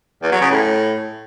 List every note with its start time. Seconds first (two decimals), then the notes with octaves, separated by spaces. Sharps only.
0.22 E2
0.31 F#3
0.41 C#3
0.50 A2